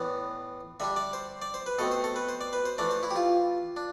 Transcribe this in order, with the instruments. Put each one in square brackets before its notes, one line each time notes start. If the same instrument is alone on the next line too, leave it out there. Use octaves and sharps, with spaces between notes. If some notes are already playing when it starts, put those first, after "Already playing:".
Already playing: [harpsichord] A2 E3 B3 D4
D3 G3 D4 E5
D5
C5
D5
C5
B4
B2 A3 C4 A4
C5
A4
B4
C5
D5
B4
C5
E3 A3 D4 D5
C5
E4
G4
F4
D4